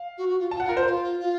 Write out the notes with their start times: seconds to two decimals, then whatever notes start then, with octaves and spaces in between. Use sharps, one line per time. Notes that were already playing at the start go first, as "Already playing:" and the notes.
Already playing: F5
0.17 F#4
0.29 F#4
0.39 F4
0.51 F4 A5
0.60 F#5
0.63 F4
0.69 A#4
0.77 C5
0.86 F4
1.19 F4